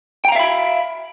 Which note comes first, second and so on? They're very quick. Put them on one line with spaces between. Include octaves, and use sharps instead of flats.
G5 A#5 F5 E5 B5